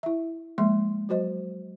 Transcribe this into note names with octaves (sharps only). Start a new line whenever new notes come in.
E4 E5
F3 G#3 A#3 E5 C6
F#3 F#4 C5 D#5